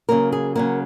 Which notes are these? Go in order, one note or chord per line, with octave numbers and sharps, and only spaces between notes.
C#3 F#3 A#3 A#4
G#4
C#3 F#3 A#3 A#4